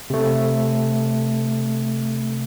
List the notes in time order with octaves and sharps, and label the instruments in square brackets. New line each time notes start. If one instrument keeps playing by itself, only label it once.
[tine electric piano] C3 A3